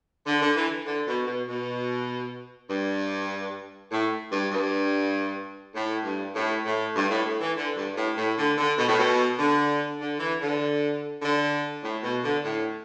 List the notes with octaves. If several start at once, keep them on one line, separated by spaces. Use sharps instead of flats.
D3
D3
E3
D3
B2
B2
B2
G2
A2
G2
G2
A2
G2
A2
A2
G2
A2
A2
E3
D3
G2
A2
A2
D3
D3
B2
A2
B2
D3
D3
E3
D3
D3
A2
B2
D3
A2